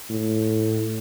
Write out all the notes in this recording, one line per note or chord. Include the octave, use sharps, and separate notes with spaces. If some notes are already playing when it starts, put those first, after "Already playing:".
A2